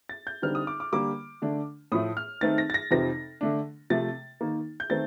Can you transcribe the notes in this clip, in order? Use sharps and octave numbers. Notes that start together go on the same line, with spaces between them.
A6
G6
D3 G3 C4 D#4 F6
D#6
D6
D6
D3 G3 A#3 D6
D3 A3 D4
A2 F3 A3 D#6
F6
D#3 A3 C4 D#4 A6
A#6
A6
A#6
F2 C3 F3 C4 D#4 A#6
D3 A3 D4
C3 F3 A3 A6
D#3 A#3 D#4
G6
D#3 A3 C4 D#4 A6